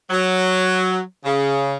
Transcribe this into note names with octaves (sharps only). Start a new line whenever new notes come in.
F#3
C#3